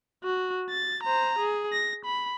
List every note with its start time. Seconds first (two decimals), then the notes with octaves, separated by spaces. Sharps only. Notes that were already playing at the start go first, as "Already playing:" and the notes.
0.24 F#4
0.70 A6
1.03 C5 A#5
1.39 G#4
1.72 A#6
2.05 B5